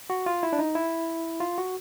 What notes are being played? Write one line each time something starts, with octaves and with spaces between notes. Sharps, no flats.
F#4
F4
E4
D4
D#4
E4
F4
F#4